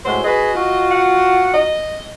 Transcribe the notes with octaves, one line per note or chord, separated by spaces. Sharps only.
A2 G#3 F#4 C5
F#4 G#4 B4 D#5
F4 F#4
F#5
D#5